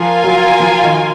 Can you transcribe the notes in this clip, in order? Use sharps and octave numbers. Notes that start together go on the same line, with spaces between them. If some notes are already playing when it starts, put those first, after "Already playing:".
Already playing: F3 F4 A#4 F5 G#5
F#3
F3
D#3